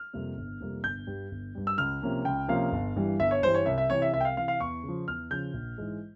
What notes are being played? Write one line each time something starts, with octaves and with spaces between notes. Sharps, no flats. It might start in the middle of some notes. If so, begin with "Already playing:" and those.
Already playing: F6
F2 C3 G3 A#3
G1
F2 C3 G3 A#3
G1 G6
G2 G3
G1
G2 G3
E6
C#2 F6
C3 F3 A#3 C#4
C#2 G5
C3 F3 A#3 C#4 F5
G1
G2 E3 G3
G1 E5
C#5
G2 E3 G3 C5
C#5
C2 E5
E5
C3 E3 C#5
E5
C2 E5
G5
F5
C3 E3 F5
F5
E2 C#6
C#3 F3
E2 F6
C#3 F3 G6
A#1
G#2 E3 G#3